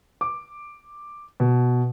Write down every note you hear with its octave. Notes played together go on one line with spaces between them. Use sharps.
D6
B2